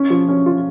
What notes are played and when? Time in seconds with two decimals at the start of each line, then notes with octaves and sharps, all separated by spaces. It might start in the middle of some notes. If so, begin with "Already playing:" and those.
Already playing: C#4
0.10 F3
0.29 C#4
0.46 F4